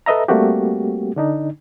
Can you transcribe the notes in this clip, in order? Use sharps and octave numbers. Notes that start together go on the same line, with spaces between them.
A4 B4 D#5 E5 A#5
G3 A3 A#3 C4 F#4 G4
D3 D4 D#4